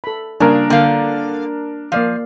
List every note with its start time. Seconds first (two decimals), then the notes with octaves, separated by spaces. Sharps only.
0.04 A4 B5
0.40 C#3 G3 A#3 D4 A#4 G#5
0.70 D3 A#3 F5 G5
1.92 F3 A#3 D5 F5